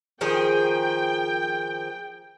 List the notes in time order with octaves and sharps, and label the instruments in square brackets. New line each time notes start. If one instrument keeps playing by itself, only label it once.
[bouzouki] D#3 F3 G#4 [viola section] G5